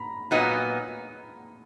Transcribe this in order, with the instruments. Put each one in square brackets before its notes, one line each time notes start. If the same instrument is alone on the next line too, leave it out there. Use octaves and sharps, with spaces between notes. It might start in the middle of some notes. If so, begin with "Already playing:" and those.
Already playing: [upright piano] A#5 B5
[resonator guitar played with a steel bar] A#2 F#3 B3 D#4